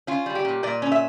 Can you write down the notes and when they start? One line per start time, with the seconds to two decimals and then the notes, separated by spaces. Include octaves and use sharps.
0.07 C#4 F4
0.26 G3
0.35 G4
0.45 A#2
0.63 A#2 D5
0.82 C#4
0.92 E5